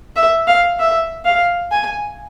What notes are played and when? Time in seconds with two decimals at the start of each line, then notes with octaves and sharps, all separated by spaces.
0.16 E5
0.47 F5
0.79 E5
1.25 F5
1.71 G#5